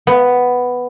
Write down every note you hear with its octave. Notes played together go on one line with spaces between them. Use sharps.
B3